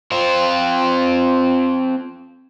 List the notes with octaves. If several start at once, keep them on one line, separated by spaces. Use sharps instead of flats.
C4 F4